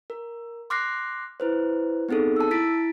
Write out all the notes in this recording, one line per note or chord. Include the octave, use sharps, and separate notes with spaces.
A#4
C6 D6 F6 F#6 A#6 C7
E4 B4 C5
B3 C4 D#4 G#4 A4
A5 E6
E4 A6 B6 D7